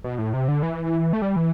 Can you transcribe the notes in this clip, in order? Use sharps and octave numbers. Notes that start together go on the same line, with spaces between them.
B2
A2
C3
D3
E3
A3
G3
E3